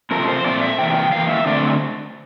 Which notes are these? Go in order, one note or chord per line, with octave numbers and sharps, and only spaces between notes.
C3 F3 A3 C4 A#4
C5
A#2 A3 C4 D5
E5
C3 E3 A#3 G5
G5
A2 E3 A#3 F5
E5
D3 A3 C4 D5